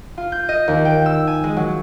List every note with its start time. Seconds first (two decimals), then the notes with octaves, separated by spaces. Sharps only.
0.17 F4
0.32 G6
0.49 D#5
0.68 D#2
0.85 G5
1.06 E6
1.27 G#5
1.44 G#3
1.57 F#3